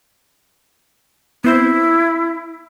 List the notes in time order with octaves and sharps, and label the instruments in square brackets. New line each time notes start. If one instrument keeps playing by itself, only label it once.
[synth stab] B3 C4 C5 [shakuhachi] E4